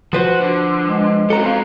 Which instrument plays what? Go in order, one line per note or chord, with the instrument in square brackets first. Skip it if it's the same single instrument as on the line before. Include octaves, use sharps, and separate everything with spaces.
[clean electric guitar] F3 B4 C5 [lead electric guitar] F#4
[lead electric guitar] D3
[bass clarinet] G#3
[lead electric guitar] C#3 F#3 [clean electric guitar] A4 A#5
[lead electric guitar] C4 F4